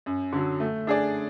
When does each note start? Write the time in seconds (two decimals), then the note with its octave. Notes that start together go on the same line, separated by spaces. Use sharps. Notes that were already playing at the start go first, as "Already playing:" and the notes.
0.06 F#2
0.33 D3 F#3
0.60 A3
0.87 D4 G#4 D5